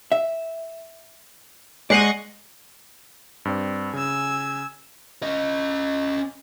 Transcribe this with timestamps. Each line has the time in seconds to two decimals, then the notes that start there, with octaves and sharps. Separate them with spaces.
0.12 E5
1.90 G#3 C5 D5 D#5 F#5 C#6 C7
3.45 G2 C4 D5
3.93 C#3 G#5 E6
5.23 C#4 D#5